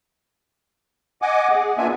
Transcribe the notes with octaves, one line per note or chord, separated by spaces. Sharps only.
D#5 F#5 G#5 D6
G#4
A#3 B3 D4 F4 E5 G#5